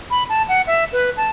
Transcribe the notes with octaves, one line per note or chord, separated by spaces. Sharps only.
B5
A5
F#5
E5
B4
A5